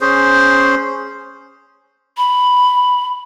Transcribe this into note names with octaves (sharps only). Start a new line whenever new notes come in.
C#4 G#4 C5
B5